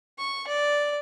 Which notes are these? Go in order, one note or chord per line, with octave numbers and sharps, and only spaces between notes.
C#6
D5